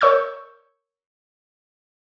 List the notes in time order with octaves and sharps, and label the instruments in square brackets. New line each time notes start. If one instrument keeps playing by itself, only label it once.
[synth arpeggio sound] A#4 C#5 C#6 E6 G6